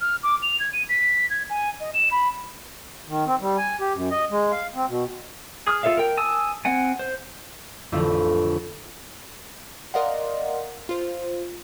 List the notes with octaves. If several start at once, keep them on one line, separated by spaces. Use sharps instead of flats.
F6
D6
F7
G#6
D#7
B6
G#6
G#5
D#5
E7
B5
D#3
C4
G3
G#5
G4
F#2
D#5
G#3
F5
C4
B2
G#4 D#6 F6
F4 A4 C#5 E5 F5
A#4 G5
G#5 A5 D#6 E6
C4 F#5 G#5
C5
A1 F2 D3 E4 F4
A#4 D5 D#5 F5 F#5 C6
F4 C5